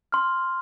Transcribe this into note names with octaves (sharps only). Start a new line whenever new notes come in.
C6 F6